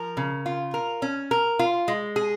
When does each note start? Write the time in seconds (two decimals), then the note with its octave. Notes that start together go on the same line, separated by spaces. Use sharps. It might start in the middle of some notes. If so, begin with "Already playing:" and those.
Already playing: F3 A#4
0.17 C#3
0.46 F4
0.74 A#4
1.02 C#4
1.31 A#4
1.59 F4
1.88 G#3
2.16 G#4